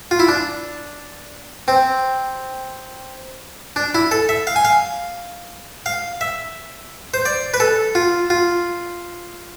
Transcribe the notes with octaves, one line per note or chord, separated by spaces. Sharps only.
F4
E4
D4
C4
D4
E4
A4
E5
F5
G#5
F5
F5
E5
C5
D5
B4
A4
F4
F4